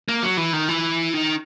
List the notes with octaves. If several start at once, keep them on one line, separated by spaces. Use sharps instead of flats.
A#3
F#3
E3
D#3
E3
D#3